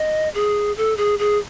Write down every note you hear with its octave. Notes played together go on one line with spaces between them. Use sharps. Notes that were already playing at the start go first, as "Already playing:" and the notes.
Already playing: D#5
G#4
A4
G#4
G#4